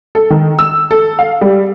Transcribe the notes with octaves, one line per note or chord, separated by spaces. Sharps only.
A4
D#3
E6
A4
F5
G3